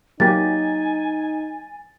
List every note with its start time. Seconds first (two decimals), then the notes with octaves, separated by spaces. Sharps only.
0.20 F#3 A#3 D#4 G4 G#5 A6